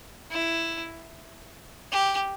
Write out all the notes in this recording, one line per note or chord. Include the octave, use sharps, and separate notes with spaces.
E4
G4